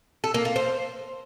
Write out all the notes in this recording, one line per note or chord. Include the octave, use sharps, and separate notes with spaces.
A4
A#3
F4
C5